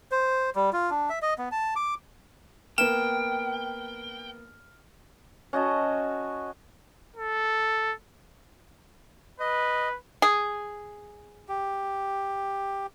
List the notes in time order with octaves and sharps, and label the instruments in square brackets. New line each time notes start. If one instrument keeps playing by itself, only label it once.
[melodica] C5
G3
F4
D4
E5
D#5
B3
A5
D6
[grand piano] A#3 B3 [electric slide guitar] G5 [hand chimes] F6 [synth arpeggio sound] E7
[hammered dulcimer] C#4 F#4 D#5 A5
[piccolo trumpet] A4
[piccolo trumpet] B4 [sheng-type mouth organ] D#5
[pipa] G#4
[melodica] G4